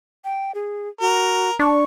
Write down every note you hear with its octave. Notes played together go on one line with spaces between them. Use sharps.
G5
G#4
F#4 A#4
D4 C#6